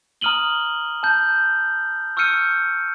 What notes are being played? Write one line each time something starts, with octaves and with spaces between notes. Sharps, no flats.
A#5 D#6 F6 D#7 F#7 G7
A5 G6
C#6 E6 F6 G6 C#7 D#7